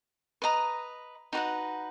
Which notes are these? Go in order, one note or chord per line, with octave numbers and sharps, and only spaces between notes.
B4 D#5 A#5
D#4 F#4 B4 F#5